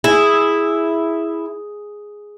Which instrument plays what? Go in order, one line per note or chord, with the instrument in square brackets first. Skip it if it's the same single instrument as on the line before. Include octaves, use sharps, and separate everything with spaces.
[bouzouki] E4 [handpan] G#4